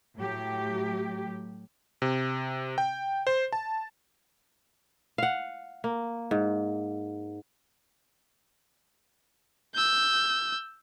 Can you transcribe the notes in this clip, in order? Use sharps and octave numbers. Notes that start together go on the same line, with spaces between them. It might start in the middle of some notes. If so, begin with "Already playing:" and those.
A2 F#3 G4
C3
G5
C5
A5
F5 F#5
A#3
G#2
E6 G6